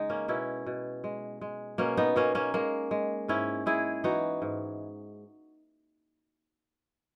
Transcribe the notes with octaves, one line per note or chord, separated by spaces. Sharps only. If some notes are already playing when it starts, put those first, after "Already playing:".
Already playing: C#3 G#3 D#4
A#3 C#4
B2 C#4 E4
B2
G#3
G#3
B2 A#3 C#4
B3 D#4
B2 A#3 C#4
A#3 C#4
G#3 A#3
G#3
G#2 C#4 E4
G#3 E4 G#4
E3 D#4 F#4
G#2